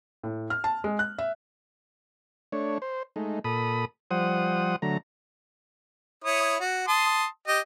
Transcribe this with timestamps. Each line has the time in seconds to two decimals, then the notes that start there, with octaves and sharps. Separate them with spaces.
0.23 A2
0.50 F6
0.64 A5
0.84 G#3
0.99 F#6
1.18 E5
2.52 A3 D4 C#5
2.82 C5
3.16 G#3 A3 D#4
3.44 A#2 A4 B5 D#6
4.11 F3 G3 C5 F#5 D#6
4.82 D3 F#3 A3 A#5
6.24 E4 C#5 D#6
6.60 F#4
6.88 A5 C6 D#6
7.47 G4 D#5